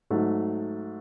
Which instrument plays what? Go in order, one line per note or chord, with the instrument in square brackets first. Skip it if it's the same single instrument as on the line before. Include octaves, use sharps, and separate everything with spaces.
[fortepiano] G#2 F#3 A3